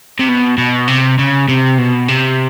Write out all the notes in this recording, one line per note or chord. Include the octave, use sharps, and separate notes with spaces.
C3
B2
B2
C3
C#3
C3
B2
C3